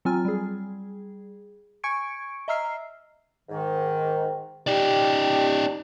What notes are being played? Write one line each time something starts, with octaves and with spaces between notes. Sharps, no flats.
F#3 C4 F4 G#5 F6
G3 G#4
G#5 C#6 G#6 C#7 D7
D#5 E5 A#5 E6 F6 C7
G#2 D#3
D#4 G4 D5